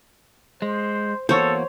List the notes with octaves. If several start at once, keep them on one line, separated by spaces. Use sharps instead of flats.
G#3 C5
E2 A#3 F#4 A4 C5 C#5